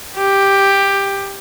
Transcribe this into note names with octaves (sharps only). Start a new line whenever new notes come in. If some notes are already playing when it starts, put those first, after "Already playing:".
G4